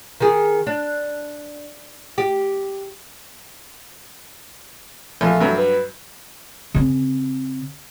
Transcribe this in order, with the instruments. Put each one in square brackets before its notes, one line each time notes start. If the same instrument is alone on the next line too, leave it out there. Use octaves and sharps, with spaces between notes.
[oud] D#3 G#4
D4
G4
[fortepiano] A#1 F4 [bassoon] A3
[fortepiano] G2 F#3
[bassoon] B4
[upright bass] C#3 C4